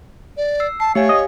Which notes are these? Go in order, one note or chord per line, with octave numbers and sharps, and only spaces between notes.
D5
E6 C7
A5 C7
A3 G4 C#5 F5 G#5
D#5